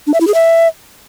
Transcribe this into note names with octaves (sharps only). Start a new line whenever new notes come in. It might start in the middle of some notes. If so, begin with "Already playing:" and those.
D4
E5
E4
G#4
E5